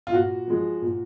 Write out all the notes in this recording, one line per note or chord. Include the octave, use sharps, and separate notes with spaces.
F4
A#2 F#4
F3 G#3
A#2